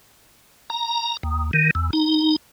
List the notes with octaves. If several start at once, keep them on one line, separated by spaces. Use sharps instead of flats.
A#5
D#2
D#3
E2
D#4